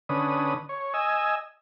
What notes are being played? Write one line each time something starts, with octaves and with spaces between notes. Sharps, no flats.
D3 C#4 B4 D#6
C#5
D#5 G#5 E6